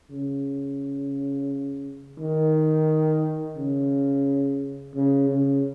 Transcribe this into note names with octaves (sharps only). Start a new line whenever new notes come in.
C#3
D#3
C#3
C#3
C#3